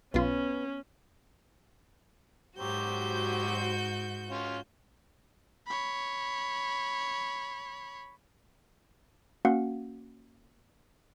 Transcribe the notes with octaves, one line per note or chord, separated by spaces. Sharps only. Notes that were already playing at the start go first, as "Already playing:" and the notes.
B1 B3 C#4 F4
G#2 F#3 F#4 G4 C5 G6
C#4 F4
C#5 B5
A#3 C#4 F#4 F5 F#5